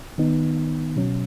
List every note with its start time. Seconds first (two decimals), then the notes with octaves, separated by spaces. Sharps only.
0.18 D#3 B3 D#4
0.96 B2 F#3 C#4